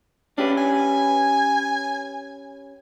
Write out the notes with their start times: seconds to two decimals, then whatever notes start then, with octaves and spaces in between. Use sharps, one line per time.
0.38 C#4 D4 G4 B4
0.58 G#5